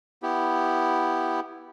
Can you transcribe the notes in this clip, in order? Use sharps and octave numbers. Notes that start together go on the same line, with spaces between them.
B3 E4 G4